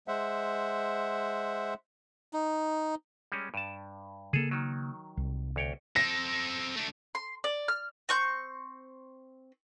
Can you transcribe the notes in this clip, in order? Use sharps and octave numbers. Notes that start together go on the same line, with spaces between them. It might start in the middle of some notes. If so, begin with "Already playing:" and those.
G#3 C5 E5 F#5
D#4
G3 G#3 C#4
G2 A5
C#3 A#3 G#4 A4
D#3 F#3
C2
D2 C#5 G5
C4 A4 A#6
A3 D4
C6
D5
F6
C4 C#6 G6